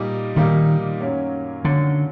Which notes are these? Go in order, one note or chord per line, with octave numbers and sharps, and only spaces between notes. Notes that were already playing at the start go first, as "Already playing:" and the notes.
Already playing: A#2 G3 A#3 D#4
A#2 D#3 G3 A#3 D#4
F#2 D#3 F#3 A#3 C#4
F#2 D3 D#3 F#3 A#3 C#4